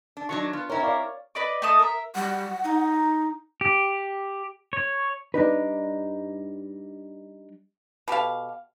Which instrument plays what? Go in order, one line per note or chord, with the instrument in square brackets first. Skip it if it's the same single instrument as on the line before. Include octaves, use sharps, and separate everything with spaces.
[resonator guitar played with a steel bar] D4
[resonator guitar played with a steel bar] D#3 F#3 D4 [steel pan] C#6
[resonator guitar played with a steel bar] B3 [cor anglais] F4
[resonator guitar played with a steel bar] C4 E4 [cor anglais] A#4 [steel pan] C#5
[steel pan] C#5 D5 F5
[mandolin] B4 D5 D#5 D6
A3 D#5 A5 D#6
A#4 E5
[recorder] G3 [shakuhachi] F#5
[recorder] D#4
[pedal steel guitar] G4
C#5
[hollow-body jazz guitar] G3 D4 D#4 B4
[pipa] B2 G4 A4 F5